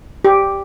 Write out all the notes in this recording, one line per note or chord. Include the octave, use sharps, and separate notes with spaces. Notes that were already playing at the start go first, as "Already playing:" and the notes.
G4